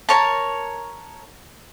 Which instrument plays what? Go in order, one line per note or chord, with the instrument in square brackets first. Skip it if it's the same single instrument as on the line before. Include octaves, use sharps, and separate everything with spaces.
[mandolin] A#4 C#5 A5